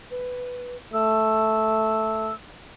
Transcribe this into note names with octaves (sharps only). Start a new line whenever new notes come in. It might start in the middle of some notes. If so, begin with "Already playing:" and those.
B4
A3 E6